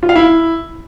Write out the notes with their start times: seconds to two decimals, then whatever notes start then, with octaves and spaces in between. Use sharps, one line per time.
0.03 F4
0.09 F5
0.16 E4